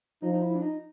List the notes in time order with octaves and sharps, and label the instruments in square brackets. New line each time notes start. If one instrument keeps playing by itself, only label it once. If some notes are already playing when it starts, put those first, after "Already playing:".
[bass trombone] F3 [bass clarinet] D#4
[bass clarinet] D#4
E4
D4
D#4